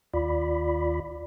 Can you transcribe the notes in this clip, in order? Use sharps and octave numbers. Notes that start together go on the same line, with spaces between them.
D#2 F4 D5 B5